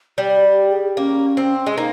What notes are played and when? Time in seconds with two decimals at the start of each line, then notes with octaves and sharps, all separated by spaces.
0.18 G3 G4
0.44 G4
0.70 G#4
0.97 A#3 C#4
1.37 C4
1.67 G#3
1.77 A#3 D#4